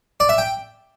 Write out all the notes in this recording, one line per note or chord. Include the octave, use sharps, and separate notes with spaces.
D5
E5
G5